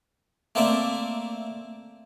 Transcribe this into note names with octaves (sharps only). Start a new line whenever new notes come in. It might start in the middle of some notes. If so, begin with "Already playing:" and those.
A3 A#3 C4 D5 E5